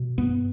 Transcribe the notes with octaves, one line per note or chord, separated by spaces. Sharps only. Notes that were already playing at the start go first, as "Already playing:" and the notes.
Already playing: B2
G2 B3